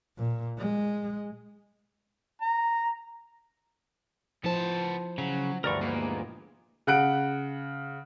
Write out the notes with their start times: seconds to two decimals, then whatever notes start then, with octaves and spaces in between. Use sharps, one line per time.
0.17 A#2
0.58 G#3
2.41 A#5
4.44 F3 B3 E4 C5 A5
5.18 C#3 F#3
5.64 D2 G2 E3 A#4 D5 C#6
5.82 A#2 G#3 A#3 B3
6.87 C#3 F#5 F#6 D7